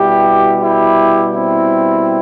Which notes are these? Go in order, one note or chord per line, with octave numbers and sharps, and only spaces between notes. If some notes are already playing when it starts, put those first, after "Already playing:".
Already playing: B2 G3 E4 G4
E4 G4
C4 E4